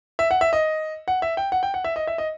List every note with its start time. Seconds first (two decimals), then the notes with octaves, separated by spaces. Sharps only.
0.19 E5
0.31 F#5
0.41 E5
0.53 D#5
1.08 F#5
1.22 E5
1.37 G5
1.52 F#5
1.63 G5
1.74 F#5
1.84 E5
1.96 D#5
2.07 E5
2.18 D#5